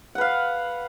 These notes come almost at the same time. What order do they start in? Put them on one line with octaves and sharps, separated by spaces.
F#5 B4 F5